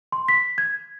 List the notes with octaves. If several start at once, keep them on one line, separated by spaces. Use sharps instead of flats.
C6
B6
G#6